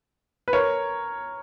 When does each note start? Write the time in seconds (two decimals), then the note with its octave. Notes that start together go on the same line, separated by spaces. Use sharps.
0.48 B4
0.53 A#4 C#5